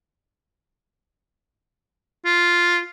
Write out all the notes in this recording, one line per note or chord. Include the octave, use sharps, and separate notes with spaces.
F4